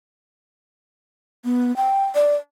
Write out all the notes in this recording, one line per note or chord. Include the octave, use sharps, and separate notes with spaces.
B3
G5
D5